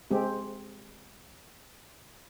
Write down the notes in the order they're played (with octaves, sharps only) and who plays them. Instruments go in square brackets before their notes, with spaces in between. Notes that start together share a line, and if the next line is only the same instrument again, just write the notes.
[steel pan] G#3 C4 G4